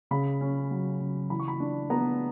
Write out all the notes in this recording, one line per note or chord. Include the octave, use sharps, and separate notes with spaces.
C#3 B5
C#4
F#3
C#3
E3 B5
C#6
B5
D4
B3 A#5